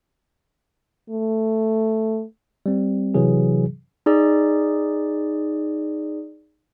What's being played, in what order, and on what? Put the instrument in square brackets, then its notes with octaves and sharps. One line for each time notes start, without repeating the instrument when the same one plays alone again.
[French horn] A3
[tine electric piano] G3 C4
C3 E3 F#3 G#4
[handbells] D#4 G#4 D5